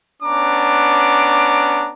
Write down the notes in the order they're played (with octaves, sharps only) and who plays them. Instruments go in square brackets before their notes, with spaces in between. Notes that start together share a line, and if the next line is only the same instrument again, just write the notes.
[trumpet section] B3 C#4 D4 A#5 D6